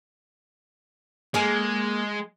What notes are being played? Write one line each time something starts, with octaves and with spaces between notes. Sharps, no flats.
G#3 A#3 G#4